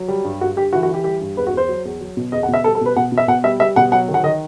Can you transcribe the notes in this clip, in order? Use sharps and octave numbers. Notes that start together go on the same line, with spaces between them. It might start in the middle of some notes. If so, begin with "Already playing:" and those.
Already playing: F#3
G3
G2
G2 F#4
G2 G4
E3 F#4
F#4
E3
G4
G3 G4
G2
E2 B4
F#4
E2 C5
F#3
E2
F#3
B2
E2 D#5
F#5
B2
E5
G3 A4
A4
B2 B4
B2 F#5
B2
E5
B2 F#5
G3 E5
G3 E5
B2 F#5
F#3 F#5
D#3
F#5
D#3 D#5